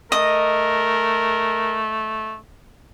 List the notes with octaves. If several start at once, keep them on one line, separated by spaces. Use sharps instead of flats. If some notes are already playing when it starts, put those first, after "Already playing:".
A3 A#4 D#5